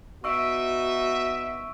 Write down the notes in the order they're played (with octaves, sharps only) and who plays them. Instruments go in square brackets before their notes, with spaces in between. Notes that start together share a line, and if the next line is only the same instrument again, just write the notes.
[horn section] B3 D#4 E5 [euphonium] F#4 [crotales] C#6 E6 D7